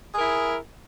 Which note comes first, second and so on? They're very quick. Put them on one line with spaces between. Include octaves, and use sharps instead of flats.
G#4 A#4 E4